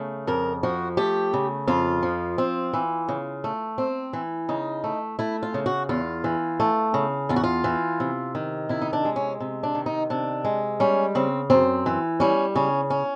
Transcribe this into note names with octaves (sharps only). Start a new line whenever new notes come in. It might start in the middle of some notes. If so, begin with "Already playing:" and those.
Already playing: C#3 A3
F2 A#4
F3 F#4
A3 G4
C#3
F2 F4
F3
C4
E3
C#3
A3
C4
E3
C#3 D#4
A3
A3 E4
F4
C#3
F#4
E2 F4
E3
A3
C#3
E2 F4
F#4
F4
E3
C3
D#3
C3 E4
D#4
D4
G#3
C#4
C3
D4
D#3
D#4
C3 D4
G#3
G3 C#4
C#3 C4
F#2 C4
E3
G3 C#4
C#3 C#4
C#4